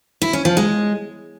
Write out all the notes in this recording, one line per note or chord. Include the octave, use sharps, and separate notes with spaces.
E4
C#4
F3
G#3